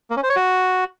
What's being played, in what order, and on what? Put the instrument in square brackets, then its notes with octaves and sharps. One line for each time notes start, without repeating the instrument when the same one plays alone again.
[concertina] A#3
C#4
C5
C#5
F#4